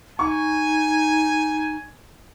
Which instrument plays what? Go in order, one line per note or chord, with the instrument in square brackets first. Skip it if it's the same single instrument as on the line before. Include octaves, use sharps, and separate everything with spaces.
[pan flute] D#4 [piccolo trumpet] G#5 [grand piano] C#6